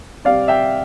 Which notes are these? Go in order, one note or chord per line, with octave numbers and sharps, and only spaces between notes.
C3 G3 C4 D5 F5
E5 G5